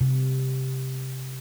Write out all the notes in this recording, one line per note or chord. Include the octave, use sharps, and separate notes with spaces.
C3